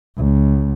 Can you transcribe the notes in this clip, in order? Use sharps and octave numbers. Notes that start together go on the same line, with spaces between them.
C#2